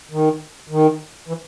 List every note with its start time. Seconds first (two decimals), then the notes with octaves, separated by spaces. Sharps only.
0.11 D#3
0.70 D#3
1.28 E3